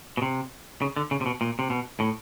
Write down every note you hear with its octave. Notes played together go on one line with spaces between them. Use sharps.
B2
C3
C#3
D3
C#3
C3
B2
A#2
C3
B2
A2